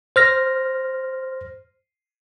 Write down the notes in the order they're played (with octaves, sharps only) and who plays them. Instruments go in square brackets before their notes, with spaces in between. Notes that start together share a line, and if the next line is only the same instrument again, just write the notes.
[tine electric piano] C5 F6 A#6